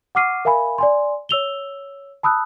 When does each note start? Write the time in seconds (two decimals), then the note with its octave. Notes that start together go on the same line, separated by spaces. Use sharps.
0.15 F#5 C#6 D6 F6 C7 D#7
0.45 A#4 E5 F5 G#5 B5
0.78 D5 G#5 C6
1.29 C#5 E6 F7 G7
2.23 A5 B5 D#6 E6 F#6